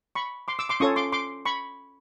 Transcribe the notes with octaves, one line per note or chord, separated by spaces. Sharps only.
B5 C#6
C6 D6
D6 E6
C6 D6
C#4 F4 A4 C#5 C#6 D#6
C6 D6
C6 D6
B5 C#6